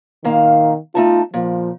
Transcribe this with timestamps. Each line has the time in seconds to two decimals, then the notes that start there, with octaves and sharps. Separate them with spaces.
0.24 A#2 D#3 A#3 F5
0.95 A3 D#4 F4 A5
1.34 A#2 F3